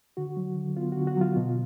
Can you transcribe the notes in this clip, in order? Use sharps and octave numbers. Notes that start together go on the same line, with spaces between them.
D3 F#4
F#3
D3
B3 F4
D3 F#4
F#4
F#3 F4
B2